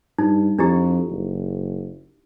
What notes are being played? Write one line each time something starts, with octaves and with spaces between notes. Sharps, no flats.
G2 D#4
F2 D4 E4 G4
F#1